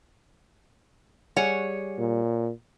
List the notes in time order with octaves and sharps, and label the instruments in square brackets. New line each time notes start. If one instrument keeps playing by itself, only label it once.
[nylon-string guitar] G3 G#4 G#5 [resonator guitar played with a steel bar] C#5 F#5
[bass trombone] A#2